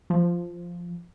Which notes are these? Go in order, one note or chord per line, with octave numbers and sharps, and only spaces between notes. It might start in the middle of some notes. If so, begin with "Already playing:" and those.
F3